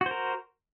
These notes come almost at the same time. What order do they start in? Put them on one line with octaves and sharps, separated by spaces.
F#4 C5 A#4